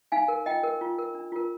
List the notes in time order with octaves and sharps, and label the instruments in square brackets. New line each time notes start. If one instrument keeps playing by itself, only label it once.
[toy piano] D#4 F5 G#5
A#4
F4 D#5 G5
A#4
F4
A#4
D4
F4 A#4